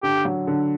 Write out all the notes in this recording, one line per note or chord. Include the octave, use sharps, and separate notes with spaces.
D3 G4
F#3
D3